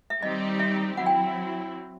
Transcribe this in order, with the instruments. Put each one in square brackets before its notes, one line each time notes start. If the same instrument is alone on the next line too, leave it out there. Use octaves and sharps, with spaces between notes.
[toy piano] E5
[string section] D#3 G3 C4 D#4 G4 [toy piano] D#5
[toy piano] E5
[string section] F#3 C4 E4 [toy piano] F#5
[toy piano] G5